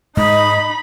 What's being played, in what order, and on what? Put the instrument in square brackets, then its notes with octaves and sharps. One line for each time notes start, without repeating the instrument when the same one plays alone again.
[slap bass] G#2 G#3 [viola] D#4 B5 [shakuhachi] D#5